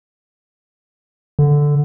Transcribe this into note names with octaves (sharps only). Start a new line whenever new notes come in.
D3